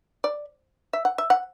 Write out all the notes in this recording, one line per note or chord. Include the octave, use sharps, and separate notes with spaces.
D5
E5
F#5
E5
F#5